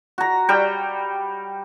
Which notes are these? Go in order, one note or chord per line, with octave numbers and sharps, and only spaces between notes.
F#4 A#5
G3 G5